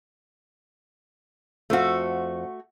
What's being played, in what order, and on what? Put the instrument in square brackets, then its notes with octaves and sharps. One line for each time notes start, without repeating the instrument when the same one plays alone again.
[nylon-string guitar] F2 C5 F5 [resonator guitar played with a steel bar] A3 F#4